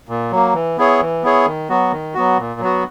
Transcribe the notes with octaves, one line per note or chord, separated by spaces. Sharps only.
A#2
F#3 A#3
E3
B3 E4 G#4 C#5
E3
B3 E4 G#4 C#5
D#3
F#3 B3 F#4
D#3
F#3 B3 F#4
A#2
F#3 B3 F#4